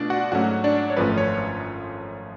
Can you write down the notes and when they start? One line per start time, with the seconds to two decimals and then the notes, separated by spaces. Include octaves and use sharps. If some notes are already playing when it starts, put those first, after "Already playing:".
Already playing: B2 A3 D4 F4 D5
0.10 F#4 F#5
0.32 G#2 F#3 A3 C#4 F#4 F#5
0.64 D4 D5
0.90 C#5
0.97 G#1 F#2 F3 A3 C#4 B4
1.18 C#5